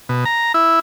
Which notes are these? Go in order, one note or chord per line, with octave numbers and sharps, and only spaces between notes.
B2
A#5
E4